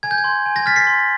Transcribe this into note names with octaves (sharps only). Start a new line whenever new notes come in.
G#5 G#6
G6
G#6
C6
G#5
G#6 A#6
F6 A6 B6
A#6 C7
C6